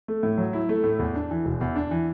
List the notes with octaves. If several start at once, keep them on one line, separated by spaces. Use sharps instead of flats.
A3
A2
F#3
E4
A3
A2
E2
D4
E3
E1
E2
D4
E3